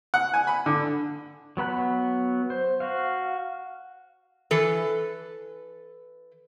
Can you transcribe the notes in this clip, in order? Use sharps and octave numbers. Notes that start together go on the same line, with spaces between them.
F#5
G#5
B5
D3
F#3 B3 B5 F#6
C5
F#4 F5
E3 A4 B4